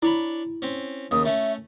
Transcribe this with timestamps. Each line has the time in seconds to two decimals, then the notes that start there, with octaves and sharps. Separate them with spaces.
0.02 D4 E4 C#5 B5
0.62 C4 C#4
1.11 D#2 C#3 D#6
1.26 A3 C#4 E5